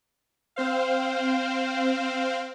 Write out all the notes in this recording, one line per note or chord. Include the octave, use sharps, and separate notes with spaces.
C4 C5 F5